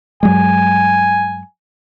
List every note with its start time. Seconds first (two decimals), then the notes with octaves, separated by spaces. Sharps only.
0.23 G2 F#3 G#3 G#5